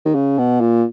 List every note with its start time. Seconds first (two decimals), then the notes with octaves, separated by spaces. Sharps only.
0.05 D#3
0.15 C#3
0.38 B2
0.61 A#2